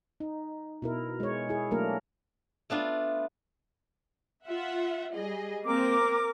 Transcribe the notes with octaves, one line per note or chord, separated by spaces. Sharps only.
D#4
B2 E4 A#4
G#3 C#5
E4 G#4
F#3 A3 A#3 D4 A#4
A3 B3 D4 F4
F4 E5 F#5
G3 G#4 D#5
A#3 C4 A#4 D6